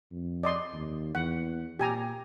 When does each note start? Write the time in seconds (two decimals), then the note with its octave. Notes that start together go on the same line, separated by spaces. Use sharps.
0.11 F2
0.43 D5 D#5 C6
0.73 D#2
1.15 E2 F#5
1.79 A#2 G4 G#5 A#5